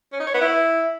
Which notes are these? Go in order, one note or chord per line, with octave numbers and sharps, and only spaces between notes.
C#4
D#4
C#5
B3
E4